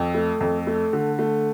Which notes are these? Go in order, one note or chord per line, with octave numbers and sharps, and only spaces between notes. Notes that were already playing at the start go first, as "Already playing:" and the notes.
Already playing: F2
A3
F2
A3
D3
A3